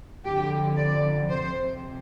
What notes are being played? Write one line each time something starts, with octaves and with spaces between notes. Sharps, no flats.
F2 D3 G4
D5
F2 C3 C5